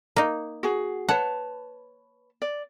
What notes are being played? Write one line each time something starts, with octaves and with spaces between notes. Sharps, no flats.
A#3 D#4
F#4 G#4
B4 C#5 F#5 A5
D5